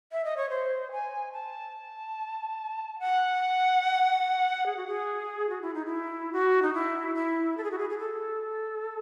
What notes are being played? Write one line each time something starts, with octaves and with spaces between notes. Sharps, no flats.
E5
D#5
C#5
C5
G#5
A5
F#5
G#4
F#4
G#4
F#4
E4
D#4
E4
F#4
D#4
E4
E4
A4
G#4
F#4
G#4
G#4
A4